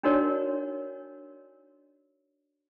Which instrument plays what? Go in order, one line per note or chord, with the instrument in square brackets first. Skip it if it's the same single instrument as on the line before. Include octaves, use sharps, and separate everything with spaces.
[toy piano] D4 D#4 F#4 A#4 C#5 D5